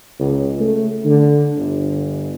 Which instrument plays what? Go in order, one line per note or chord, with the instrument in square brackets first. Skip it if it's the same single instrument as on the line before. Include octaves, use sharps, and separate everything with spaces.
[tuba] C#2
A3
D3
G1